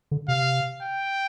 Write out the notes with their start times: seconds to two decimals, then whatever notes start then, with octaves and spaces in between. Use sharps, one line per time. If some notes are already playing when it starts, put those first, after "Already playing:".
0.11 D3
0.28 C3 F5
0.82 G5